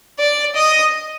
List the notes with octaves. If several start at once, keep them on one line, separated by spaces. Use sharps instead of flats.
D5
D#5